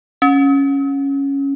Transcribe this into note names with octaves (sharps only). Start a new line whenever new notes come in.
C#4